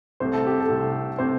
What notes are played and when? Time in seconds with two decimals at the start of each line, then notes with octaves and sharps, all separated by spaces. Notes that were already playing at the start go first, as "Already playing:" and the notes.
0.20 C2 C3 A3 C5
0.33 A4
0.47 G4
0.60 A4
0.69 C2 C3 A3
1.18 C3 A3 C5